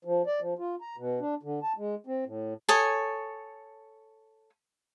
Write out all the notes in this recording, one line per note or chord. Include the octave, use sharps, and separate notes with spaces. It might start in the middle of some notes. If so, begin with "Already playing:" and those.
F3
D5
F3
F4
A#5
B2
D4
D3
A5
G#3
C4
A2
A4 C#5 G#5 D#6